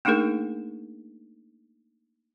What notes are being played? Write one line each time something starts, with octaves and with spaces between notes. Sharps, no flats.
A3 A#3 D4 D#4 G#4 A#4